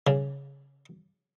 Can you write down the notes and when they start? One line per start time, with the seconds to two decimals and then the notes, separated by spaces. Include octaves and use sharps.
0.07 C#3